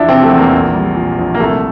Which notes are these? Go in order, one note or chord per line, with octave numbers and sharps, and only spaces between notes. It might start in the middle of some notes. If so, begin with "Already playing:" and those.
Already playing: E2 F3 D4 E4
C3 C4
A3
E2
A#3
A#1
G3
A#2
A#1
A#3
C2 A3